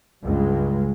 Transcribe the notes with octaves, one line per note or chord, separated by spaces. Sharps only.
C#2 G2 G#3